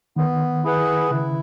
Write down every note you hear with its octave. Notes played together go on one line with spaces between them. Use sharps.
D#3 B3
E4 G#4 B4 F#5
C#3 E4